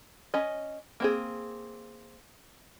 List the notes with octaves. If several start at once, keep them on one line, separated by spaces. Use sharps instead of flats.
C#4 D#5
A#3 C4 G#4